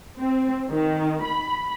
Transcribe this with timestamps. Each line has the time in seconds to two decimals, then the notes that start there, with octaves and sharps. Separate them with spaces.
0.19 C4
0.70 D#3
1.23 B5